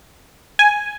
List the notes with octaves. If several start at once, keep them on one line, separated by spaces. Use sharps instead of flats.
G#5